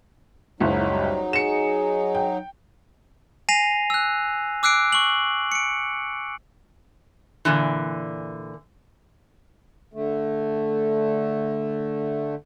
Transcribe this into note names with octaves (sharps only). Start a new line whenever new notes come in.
F#1 C#2 F#3 D#4 E4
G3
G#4 C#7 E7
G5
G#5 A#6 C7 D#7 F7
E6 F#6
D6 E6 F#6 C7 D7
C#6 F#7
C#7 D7
A#2 D3 E3
D3 A3